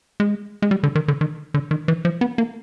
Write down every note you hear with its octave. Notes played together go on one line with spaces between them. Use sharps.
G#3
G#3
G3
D3
D#3
D3
D#3
D3
D#3
E3
F3
B3
A#3